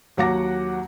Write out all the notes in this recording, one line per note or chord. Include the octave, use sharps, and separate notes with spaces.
D#2 F#3 F#4 F#5 D6 A#6